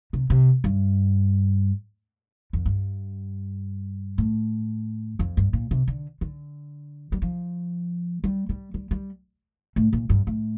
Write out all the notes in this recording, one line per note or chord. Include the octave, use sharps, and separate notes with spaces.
C3
C3
G2
F2
G2
A2
F2
G2
A#2
C3
D3
D3
G3
F3
G3
G3
G3
G3
A2
A#2
G2
A2